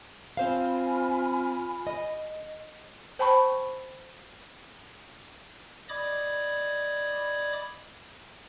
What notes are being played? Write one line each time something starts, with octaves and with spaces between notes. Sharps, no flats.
C4 F4 C5 F5 G#5 B5
D#5
C5 G5 A5 B5 C#6
D5 D#5 B5 D6 D#6 G#6